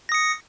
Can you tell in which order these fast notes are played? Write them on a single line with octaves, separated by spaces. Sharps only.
A#6 D#6 C#7